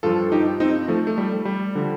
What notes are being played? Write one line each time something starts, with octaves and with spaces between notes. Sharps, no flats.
G2 F3 F4 A4
D#4 G4
C4 D#4
F3 A3
A3
G3
G3
D3 F3